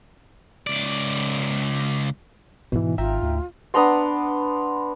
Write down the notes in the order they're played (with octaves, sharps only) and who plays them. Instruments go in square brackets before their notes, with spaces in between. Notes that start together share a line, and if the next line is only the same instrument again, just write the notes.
[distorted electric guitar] C#2 D5
[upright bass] G#2 D#4 [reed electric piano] B2 E3
[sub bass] G#1 [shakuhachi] F4 [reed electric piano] E5 G5 A#5
[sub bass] D2
[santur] B3 D4 A#5 C6